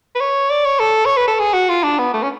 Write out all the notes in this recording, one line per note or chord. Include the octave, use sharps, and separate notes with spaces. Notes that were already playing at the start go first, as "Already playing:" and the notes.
B4
C#5
D5
C#5
A4
C#5
B4
A4
G#4
F#4
F4
D4
B3
A3
C#4